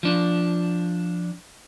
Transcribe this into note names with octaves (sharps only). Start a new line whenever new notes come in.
F3 D4